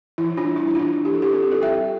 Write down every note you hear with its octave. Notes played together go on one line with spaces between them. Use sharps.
E3 E4
D4 F4
G3
E4
E4
E3 D4 F4
E3 G4
A4
E4 G4
C4 A4
G4
F4 A4
G3 E5 G5